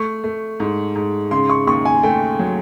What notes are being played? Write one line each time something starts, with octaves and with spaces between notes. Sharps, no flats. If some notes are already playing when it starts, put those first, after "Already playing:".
Already playing: A3 C#6
A3
G#2
G#2
C#3 C6
C#6
D#2 C#6
G#5
A3 G5
F#3